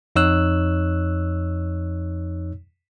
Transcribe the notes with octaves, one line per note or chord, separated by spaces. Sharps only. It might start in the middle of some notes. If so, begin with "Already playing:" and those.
F2 D#4 C#5 E6 F#6